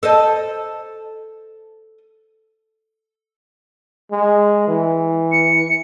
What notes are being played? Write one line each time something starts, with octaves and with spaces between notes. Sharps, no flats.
A4 C5 D#5
G#3
E3
C#7